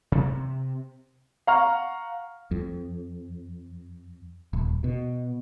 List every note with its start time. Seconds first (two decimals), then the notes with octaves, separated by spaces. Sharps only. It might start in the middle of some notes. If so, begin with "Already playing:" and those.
0.12 C3 C4
1.47 F5 F#5 A#5 C#6 F6
2.51 F2
4.53 D#1
4.84 B2